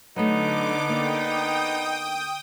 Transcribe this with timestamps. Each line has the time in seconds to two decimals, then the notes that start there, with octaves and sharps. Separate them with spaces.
0.16 D3 F#3 A3 B3 D#4 D6
0.89 A#3 D5 G5 D#6